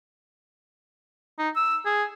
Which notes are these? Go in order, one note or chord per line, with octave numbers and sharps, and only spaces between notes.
D#4
E6
G#4